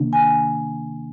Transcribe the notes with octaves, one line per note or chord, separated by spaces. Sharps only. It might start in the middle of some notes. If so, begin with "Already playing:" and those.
Already playing: C3 D#3 A#3 D4
G#5